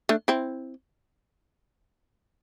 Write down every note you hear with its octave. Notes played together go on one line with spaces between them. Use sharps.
A3 D4
C4 E4